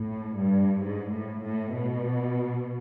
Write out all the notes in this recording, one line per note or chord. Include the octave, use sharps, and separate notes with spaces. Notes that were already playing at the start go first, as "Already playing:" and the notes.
Already playing: A2
G2
G#2
A2
A2
B2